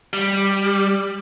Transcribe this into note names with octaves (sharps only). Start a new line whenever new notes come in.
G3